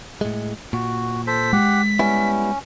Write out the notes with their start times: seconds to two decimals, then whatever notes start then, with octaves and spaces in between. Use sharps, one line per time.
0.21 A2 G#3
0.73 A#2 F#4
1.27 A4 C5 B6
1.53 G#3 G4 F#5
1.99 G3 B3 C#4 E4